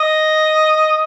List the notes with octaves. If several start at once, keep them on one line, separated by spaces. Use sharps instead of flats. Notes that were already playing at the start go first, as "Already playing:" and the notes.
Already playing: D#5